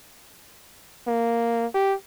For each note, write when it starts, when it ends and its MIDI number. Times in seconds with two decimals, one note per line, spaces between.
1.07 1.66 58
1.74 1.94 67